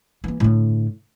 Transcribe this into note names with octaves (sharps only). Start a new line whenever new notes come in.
E3 A#3
A2 D3